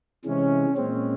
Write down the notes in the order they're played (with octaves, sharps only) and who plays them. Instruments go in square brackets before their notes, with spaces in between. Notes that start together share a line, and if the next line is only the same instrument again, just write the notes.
[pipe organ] C3 E3 G#3 [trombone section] C#4
[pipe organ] A#2 G#3 C#4 [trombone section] C4